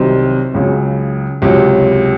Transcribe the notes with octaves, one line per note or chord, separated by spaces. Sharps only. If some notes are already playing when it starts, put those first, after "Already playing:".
Already playing: C2 C3 D#3 F#3 C4
C#2 C#3 F#3
C#2 C3 F#3 C#4